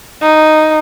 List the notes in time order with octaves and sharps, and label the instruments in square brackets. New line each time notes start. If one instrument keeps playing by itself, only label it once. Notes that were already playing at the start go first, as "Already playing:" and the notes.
[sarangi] D#4